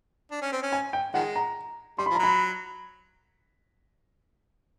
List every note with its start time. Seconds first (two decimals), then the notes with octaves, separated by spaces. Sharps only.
0.31 D4
0.42 C#4
0.52 C4
0.63 C#4
0.73 G#5
0.93 G5
1.14 D#3 F3 G#3 F#5
1.36 A#5
1.98 G3 C6
2.06 B5
2.10 F3
2.15 A#5
2.19 F#3 B5